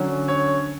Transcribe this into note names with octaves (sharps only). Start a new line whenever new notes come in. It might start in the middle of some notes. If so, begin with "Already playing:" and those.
Already playing: D3 F#3 C#4
C#5